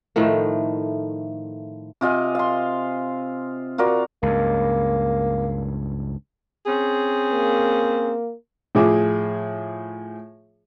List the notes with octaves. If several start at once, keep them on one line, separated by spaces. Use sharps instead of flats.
A2 D#3 F3 A3
C3 F4 D#5 G#5
F5 C6
F4 F#4 A#4 D5
C#2 G2 A#3
C4 C#4 G#4
A#3
A2 F3 G#4 D6